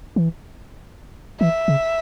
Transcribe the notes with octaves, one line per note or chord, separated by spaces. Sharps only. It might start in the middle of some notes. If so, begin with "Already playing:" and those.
E3
E3 E5
C#3